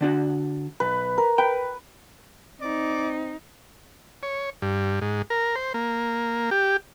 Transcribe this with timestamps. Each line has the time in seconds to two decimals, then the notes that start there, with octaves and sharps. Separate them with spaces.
0.01 D3 D4 F#4
0.80 B1 B4
1.18 A#4
1.38 B4 G5
2.61 C4 D#4 D5
4.23 C#5
4.62 G2
5.01 G#2
5.30 A#4
5.56 C5
5.74 A#3
6.51 G4